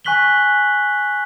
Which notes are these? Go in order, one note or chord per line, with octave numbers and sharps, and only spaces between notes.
G#5 C#6 F#6 B6 F#7 G7